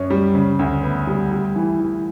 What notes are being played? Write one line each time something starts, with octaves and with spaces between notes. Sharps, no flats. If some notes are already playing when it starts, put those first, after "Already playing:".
Already playing: F#2 C#4
G3
C#3
D2
B3
G3
G3
E3
E3